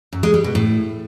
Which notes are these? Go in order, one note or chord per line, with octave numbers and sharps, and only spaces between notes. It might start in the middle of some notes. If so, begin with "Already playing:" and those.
F#2
G#3
G3
B2
A2